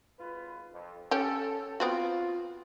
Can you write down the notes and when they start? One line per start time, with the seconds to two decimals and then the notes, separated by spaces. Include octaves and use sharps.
0.18 G#1 F4 B4
0.72 F2
1.11 C#4 G4 A4
1.80 B3 C4 F4 F#4